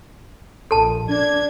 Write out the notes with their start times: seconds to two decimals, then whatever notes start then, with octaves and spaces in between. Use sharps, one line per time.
0.71 A#1 A4 A5
1.09 D4 G#6